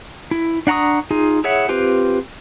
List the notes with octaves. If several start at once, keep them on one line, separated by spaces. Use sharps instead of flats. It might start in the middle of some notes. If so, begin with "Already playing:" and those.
E4
D4 F#5 A#5 C#6 D#6
D#4 F4 G#4
E4 G#4 C#5 E5 F#5
C4 F4 G4 B4 C5